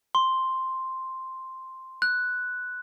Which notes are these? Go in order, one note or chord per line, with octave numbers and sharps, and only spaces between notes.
C6
F#6